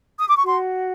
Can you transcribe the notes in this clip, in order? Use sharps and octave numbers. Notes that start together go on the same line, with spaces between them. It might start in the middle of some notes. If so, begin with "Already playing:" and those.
D#6
D6
C#6
F#4 C6